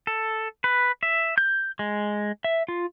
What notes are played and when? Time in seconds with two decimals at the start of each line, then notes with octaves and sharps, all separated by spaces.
0.07 A4
0.64 B4
1.03 E5
1.38 G6
1.79 G#3
2.44 E5
2.68 F4